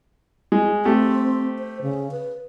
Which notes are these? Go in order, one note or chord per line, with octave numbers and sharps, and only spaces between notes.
G#3
A3 C4 G4
C5
C#3
B4